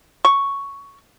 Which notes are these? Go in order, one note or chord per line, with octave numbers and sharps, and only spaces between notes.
C#6